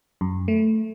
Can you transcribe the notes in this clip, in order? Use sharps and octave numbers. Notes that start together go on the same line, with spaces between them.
F#2
A3